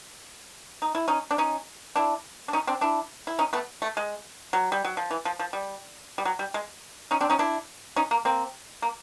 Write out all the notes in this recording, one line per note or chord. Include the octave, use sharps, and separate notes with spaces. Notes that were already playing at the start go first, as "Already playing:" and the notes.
D#4
E4
C#4 D#4
D4
C#4 D#4
D4 E4
D4
C#4 D#4
C4 D4
D4 E4
E4
C#4 D#4
A3 B3
A3
G#3
F#3
G3
F#3
F3
E3
F3
F3
G3
G3
F#3
G3
G#3
C#4 D#4
C4 D4
C#4 D#4
D4 E4
C#4 D#4
A#3
A#3 C4
A#3